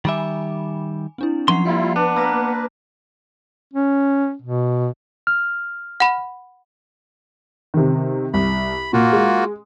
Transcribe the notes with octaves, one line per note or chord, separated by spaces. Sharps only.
D#3 G3 E5 G#5 B5 D6
C4 D4 E4
F3 F#3 C#4 F#5 C6 C7
G3 A#3 E4 F4
B3 D4 B4
A#3 E6 A#6 B6
C#4
B2
F6
F#5 B5
C3 D#3
C2 B5
A#2 A#3 F4 F#4
G#3